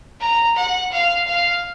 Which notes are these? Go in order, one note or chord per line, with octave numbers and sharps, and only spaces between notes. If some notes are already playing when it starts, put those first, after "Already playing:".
A#5
F#5
F5
F5